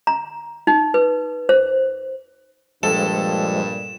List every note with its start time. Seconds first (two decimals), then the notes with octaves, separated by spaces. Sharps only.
0.07 A#5
0.67 D#4
0.94 B4
1.49 C5
2.83 G2 A#2 F3 G#3 A4 E7